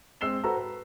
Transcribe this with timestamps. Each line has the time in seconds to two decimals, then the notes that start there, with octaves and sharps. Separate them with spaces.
0.21 G#3 C4 E6 C7 E7 G7
0.44 F#4 A4 B4 C5 A#5 E6
0.57 B4